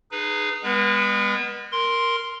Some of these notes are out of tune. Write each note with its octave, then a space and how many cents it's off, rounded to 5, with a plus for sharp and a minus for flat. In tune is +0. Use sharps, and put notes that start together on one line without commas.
D#4 -30 G#4 +0 B4 +0
G#3 -40 B3 +0 B4 -30
A#4 +0 C6 +0